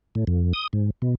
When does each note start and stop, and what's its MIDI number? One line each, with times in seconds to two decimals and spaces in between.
0.15 0.25 45
0.27 0.53 41
0.53 0.67 87
0.73 0.90 44
1.02 1.15 47